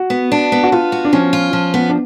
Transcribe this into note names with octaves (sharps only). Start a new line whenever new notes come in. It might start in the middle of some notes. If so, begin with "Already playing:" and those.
Already playing: F#4
B3
D4
B3
F#4
B3 F4
F#4
D4
F3 C#4
F4
F3
B3
D4